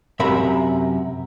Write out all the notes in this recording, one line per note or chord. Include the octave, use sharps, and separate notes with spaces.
F#2 C3 A#4 E5 B5